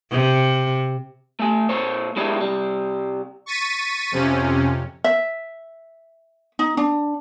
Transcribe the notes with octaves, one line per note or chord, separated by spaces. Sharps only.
C3
A3 G#5
A#2 A#3 C5 C#5
G#3 A#3 D4 E4 G4 C#5
C2 G3
C#6 A6 B6 D#7
F2 C3 C#4
E5
D#4
D4